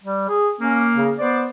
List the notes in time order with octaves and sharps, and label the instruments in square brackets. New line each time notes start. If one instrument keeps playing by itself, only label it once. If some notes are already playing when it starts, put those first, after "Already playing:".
[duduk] G3
G#4
[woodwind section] A#3 [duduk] C#4
[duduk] C#3
[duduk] B3 [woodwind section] C5 D5